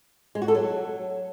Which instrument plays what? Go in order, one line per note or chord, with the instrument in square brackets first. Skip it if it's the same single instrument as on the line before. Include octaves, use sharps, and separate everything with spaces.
[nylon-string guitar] G#3
F#4
A4
F#3